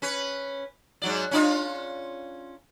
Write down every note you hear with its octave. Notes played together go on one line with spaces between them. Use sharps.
C#4 B4
G#2 F#3 D5
C#4 D4 F4